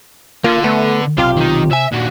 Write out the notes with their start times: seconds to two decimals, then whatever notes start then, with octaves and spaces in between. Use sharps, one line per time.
0.44 D3 A#3 F4
0.64 A3 B3
1.18 B1 C3 F4 G4 F5
1.36 D#3 D#4
1.71 C3 E5 G#5
1.92 D#2 A#2 F#4